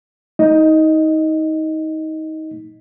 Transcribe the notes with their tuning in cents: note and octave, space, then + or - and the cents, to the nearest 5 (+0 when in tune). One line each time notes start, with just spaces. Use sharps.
A3 +30 D#4 +25 D#5 +0